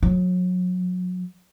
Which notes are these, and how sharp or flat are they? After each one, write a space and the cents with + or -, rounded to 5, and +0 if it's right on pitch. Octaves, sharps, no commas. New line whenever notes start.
F#3 -35